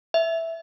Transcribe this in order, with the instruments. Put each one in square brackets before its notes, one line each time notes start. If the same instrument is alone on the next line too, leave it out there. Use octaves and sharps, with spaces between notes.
[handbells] E5